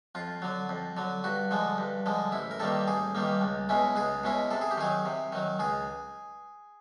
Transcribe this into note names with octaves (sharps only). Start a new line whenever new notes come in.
F2 F4
D3 F#3
F2
D3 F#3
G2 F#4
D3 F3 G#3
G2
D3 F3 G#3
A1 E4
A#4
G2 D#3 G3 A#3 A4
A1 G#4
G2 D#3 G3 A#3
C#2
B2 G#3 C#4 E4
C#2 G#4
B2 G#3 C#4 E4
C3 A4
G#4
G4
D#3 F#3 G#4
C3
D#3 F#3
C#2 G#4